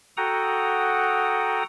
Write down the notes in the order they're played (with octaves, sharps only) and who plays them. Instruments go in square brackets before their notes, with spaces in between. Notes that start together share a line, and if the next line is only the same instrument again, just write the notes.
[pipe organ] F#4 A4 F#5 G5 A#5 D#6